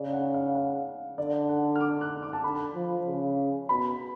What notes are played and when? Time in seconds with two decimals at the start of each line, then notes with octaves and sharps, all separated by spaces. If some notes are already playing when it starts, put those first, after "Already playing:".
Already playing: C#3 D5
0.13 F#5
0.34 F5
0.55 F5
1.18 D3 D5
1.49 F#5
1.76 F6
1.81 D6
2.01 F#6
2.23 D6
2.33 A5
2.43 D3 B5
2.75 F3
3.06 C#3
3.69 B2 B5